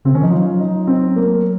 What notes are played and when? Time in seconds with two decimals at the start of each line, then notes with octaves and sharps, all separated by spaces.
0.05 C#3 C4
0.14 D#3 C#4
0.22 F3 D#4
0.30 F#3 F4
0.60 D#4
0.87 C4
1.16 A#3